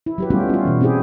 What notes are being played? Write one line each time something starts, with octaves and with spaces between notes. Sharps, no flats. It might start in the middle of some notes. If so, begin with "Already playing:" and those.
E4
F#3 G4 B4
G3 A3 B3 C#4 F4 G4
C#4 F4
B2 E3
C4 C#4 E4 G4 G#4